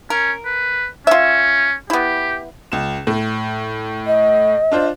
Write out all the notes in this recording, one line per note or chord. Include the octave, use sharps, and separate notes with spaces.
C#4 A#4
B4
C#4 F4 E5
B3 E4 G4
C#2 E7
A2
D#5
D4 F4 C5